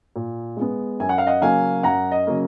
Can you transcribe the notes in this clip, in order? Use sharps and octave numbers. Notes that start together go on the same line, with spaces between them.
A#2
G#3 B3
F#2 G#5
F#5
F5
D#5 F#5
C#3 F#3 A#3 F5 G#5
F#2 F#5 A#5
D#5
C#3 F#3 A#3